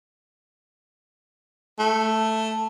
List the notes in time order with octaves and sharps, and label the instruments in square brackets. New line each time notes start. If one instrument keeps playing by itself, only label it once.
[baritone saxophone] A3